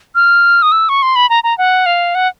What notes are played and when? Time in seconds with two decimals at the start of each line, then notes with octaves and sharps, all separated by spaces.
0.15 F6
0.62 D#6
0.72 E6
0.89 C#6
1.02 C6
1.16 B5
1.30 A#5
1.44 A#5
1.58 F#5
1.86 F5
2.15 F#5